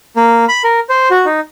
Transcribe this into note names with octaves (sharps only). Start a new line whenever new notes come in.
A#3
B5
A#4
C5
F#4
D#4